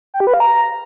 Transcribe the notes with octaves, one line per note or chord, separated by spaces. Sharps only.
G5
G4
B4
F5
A#5